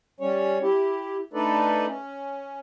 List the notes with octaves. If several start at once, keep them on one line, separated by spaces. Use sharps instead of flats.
G3 C#4 C#5
E4 G4
A3 D4 D#4 A4 B4 D5
C#4